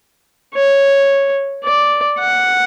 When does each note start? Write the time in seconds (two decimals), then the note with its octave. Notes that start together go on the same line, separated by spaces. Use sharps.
0.54 C#5
1.64 D5
2.20 F#5